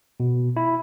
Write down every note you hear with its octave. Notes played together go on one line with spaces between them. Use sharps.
B2
E4